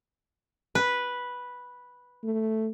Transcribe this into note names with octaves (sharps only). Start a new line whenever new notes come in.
B4
A3